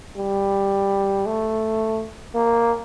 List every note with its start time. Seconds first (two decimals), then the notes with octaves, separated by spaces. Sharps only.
0.17 G3
1.26 A3
2.35 A#3